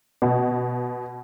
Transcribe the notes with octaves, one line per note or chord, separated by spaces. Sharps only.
B2